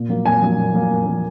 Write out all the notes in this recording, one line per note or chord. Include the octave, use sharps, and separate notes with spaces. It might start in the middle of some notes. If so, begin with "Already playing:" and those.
Already playing: A#2
F#3 A#3
A#2 G#5
F#3 A#3
A#2
F#3 A#3
A#2
F#3 A#3